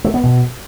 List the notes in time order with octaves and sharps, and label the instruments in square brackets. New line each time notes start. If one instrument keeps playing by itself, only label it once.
[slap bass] A3
B3
B2